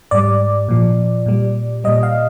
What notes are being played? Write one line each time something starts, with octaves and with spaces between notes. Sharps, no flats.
G#2 G3 D5
A#2 F3
A#2 G3
A#2 G3 D#5
F5